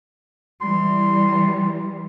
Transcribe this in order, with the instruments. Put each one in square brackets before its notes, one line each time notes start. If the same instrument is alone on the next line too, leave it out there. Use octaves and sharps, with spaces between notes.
[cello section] E3 G3 [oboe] C6